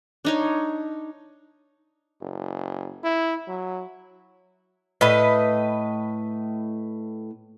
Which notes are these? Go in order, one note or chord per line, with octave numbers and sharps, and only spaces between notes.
D4 D#4 C#5
F#1
E4
F#3
A2 B4 D#5